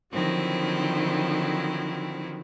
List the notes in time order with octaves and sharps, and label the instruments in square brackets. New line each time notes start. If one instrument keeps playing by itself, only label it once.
[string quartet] D3 D#3 F3 F#3 C4 E4